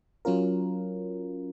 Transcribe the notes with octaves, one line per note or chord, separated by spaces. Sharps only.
F#3 C#4 F4 A#4